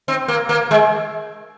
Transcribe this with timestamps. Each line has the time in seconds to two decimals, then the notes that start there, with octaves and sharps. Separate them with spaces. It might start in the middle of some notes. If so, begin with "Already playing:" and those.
0.08 C4
0.28 A#3
0.49 A#3
0.71 G#3